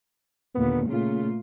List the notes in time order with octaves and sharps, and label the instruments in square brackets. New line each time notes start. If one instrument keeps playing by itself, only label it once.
[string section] D#2 A#2 D3 [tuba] B3
[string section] A#2 A3 F4 [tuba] C#3